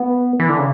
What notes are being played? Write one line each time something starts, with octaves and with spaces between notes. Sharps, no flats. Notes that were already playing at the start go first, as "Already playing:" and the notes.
Already playing: B3
E3
D3
C#3